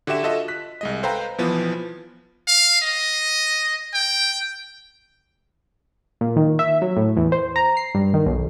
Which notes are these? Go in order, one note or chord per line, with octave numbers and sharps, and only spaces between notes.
D3 F#4 G4 E5 E7
F4 F#4 A4 D#5 E5
F#6 B6
C2 G#3 D#5
A4 B4 C5 F5 G5 A#5
B1 E3 F3 B3
F5
D#5
G5
A#2
D#3
E5
F#3
A2
E2
C5
A#5
C7
G2
D#3
B1